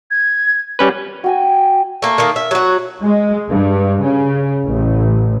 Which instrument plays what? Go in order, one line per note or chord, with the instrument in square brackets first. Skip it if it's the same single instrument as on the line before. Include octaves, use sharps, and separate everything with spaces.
[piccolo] G#6
[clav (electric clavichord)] G3 C#4 B4
[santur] F#4 G5 G#5
[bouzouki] A3 A#3
D#3 A3 A#3
E5
F#3 F#4
[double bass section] G#3
G2
C#3
A1